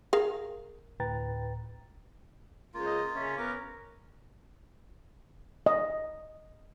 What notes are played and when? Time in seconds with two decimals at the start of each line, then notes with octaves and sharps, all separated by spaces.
0.13 G#4 A#4 F5
1.00 D2 A2 B4 G5 A#5 A6
2.74 C#2 A#3 F4
2.86 D#5
3.15 C#3 C#4 E5
3.37 B3 A#4 D6
5.66 D#5